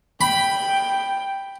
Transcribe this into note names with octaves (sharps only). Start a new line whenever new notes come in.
G5 B5